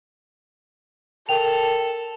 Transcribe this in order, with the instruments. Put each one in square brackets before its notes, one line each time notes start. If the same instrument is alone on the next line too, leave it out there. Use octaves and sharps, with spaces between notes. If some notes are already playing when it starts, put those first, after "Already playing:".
[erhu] A4 [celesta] A#4 G5 F7